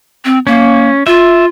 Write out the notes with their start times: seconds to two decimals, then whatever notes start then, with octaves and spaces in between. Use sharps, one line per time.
0.25 C4
0.47 A#3 C#4
1.07 F4 E5